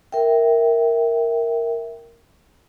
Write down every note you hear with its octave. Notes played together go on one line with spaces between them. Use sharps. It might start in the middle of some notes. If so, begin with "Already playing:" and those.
A#4 E5 G5